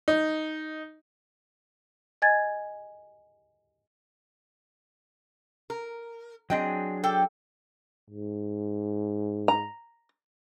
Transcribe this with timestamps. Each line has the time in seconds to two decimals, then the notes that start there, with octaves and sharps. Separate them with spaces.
0.08 D#4
2.22 D#5 G#5 G#6 A6
5.70 A#4
6.50 F#3 C4 D4 G#4 D#5 G5
7.04 A4 G5 D6
8.10 G#2
9.48 A#5